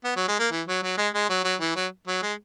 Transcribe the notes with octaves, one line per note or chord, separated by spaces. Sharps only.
B3
F#3
G#3
A#3
E3
F#3
F#3
G#3
G#3
F#3
F#3
E3
F#3
F#3
G#3